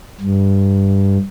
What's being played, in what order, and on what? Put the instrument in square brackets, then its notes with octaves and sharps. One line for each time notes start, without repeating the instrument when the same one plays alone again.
[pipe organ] G2